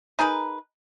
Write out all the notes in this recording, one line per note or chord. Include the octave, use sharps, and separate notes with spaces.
D#4 G#4 A#4 B4